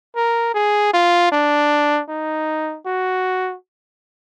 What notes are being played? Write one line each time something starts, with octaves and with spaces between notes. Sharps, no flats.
A#4
G#4
F4
D4
D#4
F#4